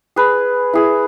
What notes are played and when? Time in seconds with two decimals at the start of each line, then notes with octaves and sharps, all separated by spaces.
0.16 G#4 B4
0.73 E4 G#4